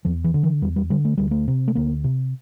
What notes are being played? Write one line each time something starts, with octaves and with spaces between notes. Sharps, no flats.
E2 F3
E3
D3
E3
E2 G3
G3
D3 G3
A3
D2 G3
A3
C3
A3
D2 A#3
C3